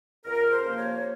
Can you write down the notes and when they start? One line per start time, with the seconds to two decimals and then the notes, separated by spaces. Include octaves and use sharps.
0.25 C#2 A#4
0.51 C5
0.64 C3 F3 A#3
0.77 C#5